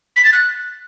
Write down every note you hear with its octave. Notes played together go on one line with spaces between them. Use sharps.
B6
A6
F#6